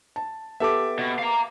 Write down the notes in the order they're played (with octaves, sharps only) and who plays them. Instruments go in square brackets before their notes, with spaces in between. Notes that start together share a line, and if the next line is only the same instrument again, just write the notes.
[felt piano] A5
[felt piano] B3 G4 A4 [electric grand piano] E5 A5 D6
[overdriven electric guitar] B2
F5 A#5